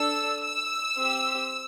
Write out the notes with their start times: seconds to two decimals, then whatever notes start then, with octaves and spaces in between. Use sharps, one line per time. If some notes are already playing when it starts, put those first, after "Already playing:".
Already playing: D4 A4 E6
0.43 E6
0.99 C4 G4